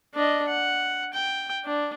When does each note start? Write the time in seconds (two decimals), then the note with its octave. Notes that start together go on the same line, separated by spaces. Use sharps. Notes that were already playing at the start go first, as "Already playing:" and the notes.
0.14 D4 D#5
0.48 F#5
1.13 G5
1.65 D4